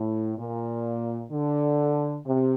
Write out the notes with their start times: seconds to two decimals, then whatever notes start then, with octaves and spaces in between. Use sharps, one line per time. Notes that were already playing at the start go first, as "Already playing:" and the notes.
Already playing: A2
0.38 A#2
1.31 D3
2.26 C3